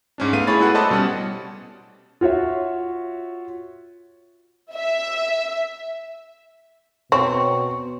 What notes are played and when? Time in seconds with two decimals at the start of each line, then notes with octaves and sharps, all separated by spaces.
0.18 G#2 C#4 D4
0.33 A3 B3 F5 D#7
0.47 E4 G#4 C#5 B5 A6
0.60 G#3 A3 E4 F#4 B4 F#5
0.74 A4 B4 C5 D5 D#5 A5
0.90 B2 G3 C#4 F#5
2.21 F4 F#4 C#5 E5
4.74 E5
7.12 B2 C4 C#5 C#6